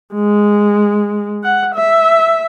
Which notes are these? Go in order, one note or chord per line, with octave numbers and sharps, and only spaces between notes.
G#3
F#5
E5